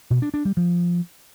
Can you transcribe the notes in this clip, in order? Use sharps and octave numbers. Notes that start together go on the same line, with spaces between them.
B2
D4
D4
G3
F3